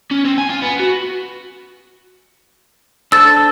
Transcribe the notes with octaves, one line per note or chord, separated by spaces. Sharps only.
C#4
C4
G#5
F4
B3
F#4
D4 A4 C5 E6 A6